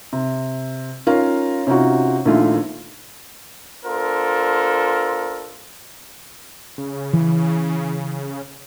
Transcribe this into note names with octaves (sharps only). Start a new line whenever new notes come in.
C3
C#4 D#4 F4 A#4 C#5 F5
C3 C#4 D#4 F4 F#4
A#1 D#3 A3 E4 F4
B3 D4 F4 A4 A#4 C5
C#3
E3